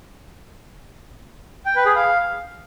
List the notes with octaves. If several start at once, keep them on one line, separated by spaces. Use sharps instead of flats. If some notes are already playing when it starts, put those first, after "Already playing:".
G5
B4
G#4
F5